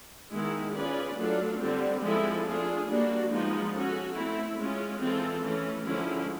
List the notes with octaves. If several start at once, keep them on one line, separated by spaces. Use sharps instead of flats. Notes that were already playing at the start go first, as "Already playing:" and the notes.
D#3 G#3 B3 E4
C#4 F4 G#4 B4 D5
F#3 A3 D4 F4 A4
D3 G3 C4
F3 G#3 C4 E4 A4
A3 D4 F4 G#4
G3 A#3 D4 F#4
F3 G#3 B3 D#4
C#4 F#4 A4
A3 C4 E4
G#3 C#4 F4
E3 G#3 C4 F4 A4
E3 A3 C#4
D3 F3 G#3 C#4 E4